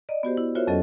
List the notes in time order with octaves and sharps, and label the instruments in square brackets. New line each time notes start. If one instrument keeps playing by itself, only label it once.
[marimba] D5 D#5
B3 F#4 G4 C5
E4
F4 F#4 A#4 C5 C#5 E5
F2 F#3 C#4 A4 D#5